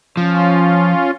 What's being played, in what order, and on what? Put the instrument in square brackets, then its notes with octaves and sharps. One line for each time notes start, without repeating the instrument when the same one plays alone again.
[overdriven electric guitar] F3 [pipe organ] C#4 F4